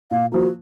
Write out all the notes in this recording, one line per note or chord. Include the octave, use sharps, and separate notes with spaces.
A#2 F5
F3 A#3 F#4